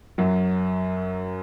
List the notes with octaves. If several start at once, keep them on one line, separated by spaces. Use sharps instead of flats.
F#2 F#3